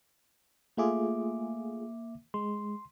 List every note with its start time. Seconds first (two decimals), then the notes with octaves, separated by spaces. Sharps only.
0.77 A3 A#3 F4 G#4 E5 D6
2.34 G#3 C6